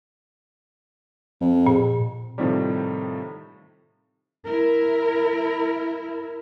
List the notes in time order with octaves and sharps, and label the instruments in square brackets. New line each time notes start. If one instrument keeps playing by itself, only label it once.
[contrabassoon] F2
[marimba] A#2
[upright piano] A2 C3 D#3 F3 G3
[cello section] E4 A#4